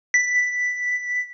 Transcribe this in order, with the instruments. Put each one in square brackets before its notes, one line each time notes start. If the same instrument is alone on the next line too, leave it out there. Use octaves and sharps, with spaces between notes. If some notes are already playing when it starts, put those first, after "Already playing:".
[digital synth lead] B6